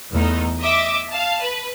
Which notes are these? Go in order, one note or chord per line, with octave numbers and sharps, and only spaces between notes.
E2 A3 D#4
D#5 E5 D6
F5 A5
B4